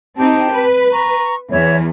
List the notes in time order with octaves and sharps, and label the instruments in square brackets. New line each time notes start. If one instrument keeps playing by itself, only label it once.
[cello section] C4 D#4 [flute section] G4 G5 A5
[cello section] B4
[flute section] A#5 C#6
[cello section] E2 E3 [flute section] C#5 E5